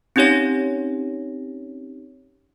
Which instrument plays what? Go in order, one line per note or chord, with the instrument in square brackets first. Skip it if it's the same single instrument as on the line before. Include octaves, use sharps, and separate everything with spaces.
[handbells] C4 C#4 D#4 G4 C#5 A#6